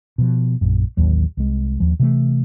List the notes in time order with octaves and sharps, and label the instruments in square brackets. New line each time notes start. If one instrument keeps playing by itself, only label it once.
[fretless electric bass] B2 F3
A#1 F#2
A1 D#2 F#3
C2 G#3
D#2 F3
C3 E3 A3